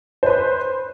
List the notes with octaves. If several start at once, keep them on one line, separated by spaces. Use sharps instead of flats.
B4 C5 C6